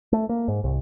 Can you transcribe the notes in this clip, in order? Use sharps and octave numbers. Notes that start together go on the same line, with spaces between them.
A3
A#3
G#2
C2